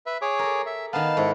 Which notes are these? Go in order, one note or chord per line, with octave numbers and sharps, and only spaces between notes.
B4 E5
G#4 C#5 D6
A4 A#4
E5
D#3 B3 F5 A5
G#2 E4 A4